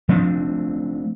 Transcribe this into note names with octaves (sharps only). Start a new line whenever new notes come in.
F3 A3 C4 D4